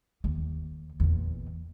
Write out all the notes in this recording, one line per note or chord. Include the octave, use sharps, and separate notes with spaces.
D#2
E2 A#2